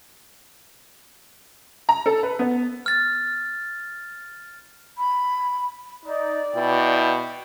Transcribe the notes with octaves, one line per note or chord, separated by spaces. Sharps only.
A#5
A4
B4
B3
F6 A6
B5
D#4 D5
B2 E4 G5